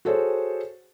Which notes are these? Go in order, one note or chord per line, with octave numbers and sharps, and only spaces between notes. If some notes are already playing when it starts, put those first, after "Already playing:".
F#4 G#4 A4 C5 C#5